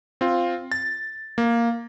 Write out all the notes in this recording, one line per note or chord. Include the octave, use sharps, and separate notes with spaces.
C4 F4
A6
A#3